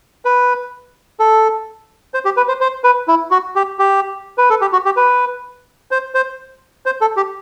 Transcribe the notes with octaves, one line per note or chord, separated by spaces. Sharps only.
B4
A4
C5
G4
B4
C5
C5
B4
E4
F#4
G4
G4
B4
A4
G4
F#4
G4
B4
C5
C5
C5
A4
G4